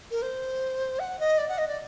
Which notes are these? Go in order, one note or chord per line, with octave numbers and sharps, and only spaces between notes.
A#4
C5
F#5
D#5
D5
F#5
D#5
D5